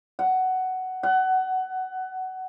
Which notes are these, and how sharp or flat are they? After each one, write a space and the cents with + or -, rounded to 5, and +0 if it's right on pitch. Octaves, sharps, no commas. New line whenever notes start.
F#5 +10
F#5 +20